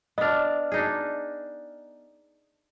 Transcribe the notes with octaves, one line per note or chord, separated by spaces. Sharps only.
B3 D4 D#5 F6
D4 D#4 G#4